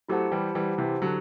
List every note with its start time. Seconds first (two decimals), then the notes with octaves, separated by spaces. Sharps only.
0.09 F#3 A3 E4 G4 C5 F#5 A5
0.32 E3 G3
0.55 E3 G3
0.78 C3 E3
1.02 D3 F#3